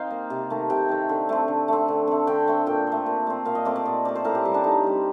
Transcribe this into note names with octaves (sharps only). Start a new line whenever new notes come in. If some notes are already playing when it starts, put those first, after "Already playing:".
Already playing: D#3 C4 A#4 C5 D#5 F5 G5
A#3
C3
D#3 A3
C3 G5
D#3 A3
D3
A3 C4
D3
A3 C4
D3
A3 C4
D3 G5
A3 C4
A#2 G5
A3 C4
A#2
A3 C4
A#2 F5
D#5
A3 C4 D5
D5
A#2 D#5
A3 C4 D5
C5
A2 A#4
G4
G3 C4
D4
A2 D#4
G3 C4